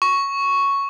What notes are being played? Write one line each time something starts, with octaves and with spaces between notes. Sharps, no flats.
C#6